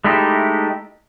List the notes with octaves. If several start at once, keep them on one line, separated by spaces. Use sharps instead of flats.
G#3 A3 D#4 E4 G4